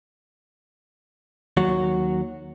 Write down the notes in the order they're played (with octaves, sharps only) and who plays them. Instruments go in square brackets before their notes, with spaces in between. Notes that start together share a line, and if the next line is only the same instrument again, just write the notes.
[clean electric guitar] D#2 F#3 F#4